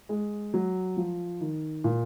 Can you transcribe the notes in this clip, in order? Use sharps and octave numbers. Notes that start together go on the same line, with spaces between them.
G#3
F#3
F3
D#3
A#2